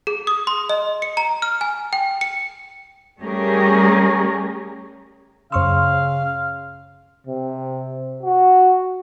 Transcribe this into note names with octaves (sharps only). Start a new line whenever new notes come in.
G#4
D#6
C6
D#5
C#7
A#5
F6
G#5
G5
C#7
G3 A3 C#4 G4 G#4 A#4
F#2 C#3 F5 C6 C#6 E6
C3
F#4